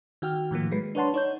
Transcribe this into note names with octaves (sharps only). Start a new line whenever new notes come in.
D#3 F#4 G5 F6
A2 D#3 F3 A#3
F#3 G#3 A3 B4 C7
G#3
D4 B4 C#5 F#5 A5 C6
D#4 C#5 G6